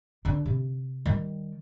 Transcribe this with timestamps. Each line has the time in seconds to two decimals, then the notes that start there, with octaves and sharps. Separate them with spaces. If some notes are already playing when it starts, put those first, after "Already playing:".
0.25 D3 D4
0.46 C3
1.06 D#3 G3